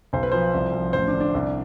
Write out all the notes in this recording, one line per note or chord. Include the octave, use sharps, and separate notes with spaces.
B1 C5
B4
F3 C5
C2
F3
A1 C5
D4
D3
D4
C2